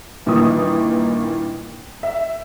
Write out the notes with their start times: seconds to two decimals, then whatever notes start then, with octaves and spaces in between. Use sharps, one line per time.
0.26 G2 A#2 D#3 E3 A#3 D#6
2.03 E5